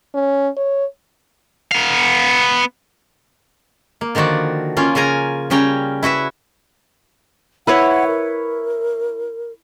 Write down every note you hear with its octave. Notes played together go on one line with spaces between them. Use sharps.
C#4
C#5
B3 F5
A#3
D3 D#3 F3 F#4 D5
A#3 C#4 F4
C#3 F4 A#4 G#5 A#5
C#3 G3 C#4 G5 A#5
E4 F#4 B4 E5
E4 B4 C#5 F#5
A#4